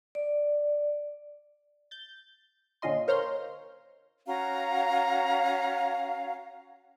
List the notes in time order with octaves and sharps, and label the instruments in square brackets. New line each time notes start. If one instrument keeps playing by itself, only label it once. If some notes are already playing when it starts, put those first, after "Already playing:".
[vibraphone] D5
[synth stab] G6 A6
A#2 D3 C#4 F4 D#5 C6
A#4 C5 C#5 F5 A#5 C6
[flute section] C#4 F#4 F5 A#5